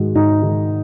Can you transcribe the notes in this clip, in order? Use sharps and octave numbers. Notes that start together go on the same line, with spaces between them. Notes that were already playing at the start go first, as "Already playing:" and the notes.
Already playing: G#2 D#3 G#3 F#4
G#2 D#4
D#3 G#3